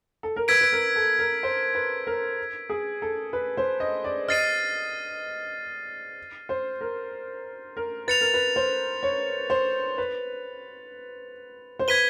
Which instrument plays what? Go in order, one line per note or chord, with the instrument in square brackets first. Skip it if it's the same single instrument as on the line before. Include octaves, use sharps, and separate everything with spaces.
[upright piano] A4
A#4
[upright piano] B4 [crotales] E6 G#6 B6 D7
[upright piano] B4
A#4
A4
A#4
C5
B4
A#4
G#4
A4
B4
C5
D#5
D5
[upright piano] D#5 [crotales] F6 A6 C7 D#7
[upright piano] C5
A#4
A#4
[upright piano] B4 [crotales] A6 C#7 F7
[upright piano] A#4
B4
C5
C#5
C5
B4
C5
[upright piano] B4 [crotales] G#6 B6 D#7 G7